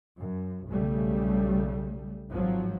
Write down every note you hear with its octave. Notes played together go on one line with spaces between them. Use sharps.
F#2
B1 C#3 G3 A3
G#1 F3 F#3